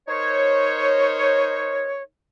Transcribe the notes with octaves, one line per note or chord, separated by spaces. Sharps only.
D#4 A#4 C5 C#5